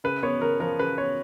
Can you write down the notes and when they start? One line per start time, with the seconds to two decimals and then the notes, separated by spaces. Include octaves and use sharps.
0.04 C#3 B4
0.23 B3 C#5
0.41 C#3 A#4
0.60 F3 A#4
0.79 C#3 B4
0.98 B3 C#5